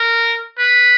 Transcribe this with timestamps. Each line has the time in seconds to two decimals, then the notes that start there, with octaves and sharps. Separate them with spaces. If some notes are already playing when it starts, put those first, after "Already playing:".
Already playing: A#4
0.58 B4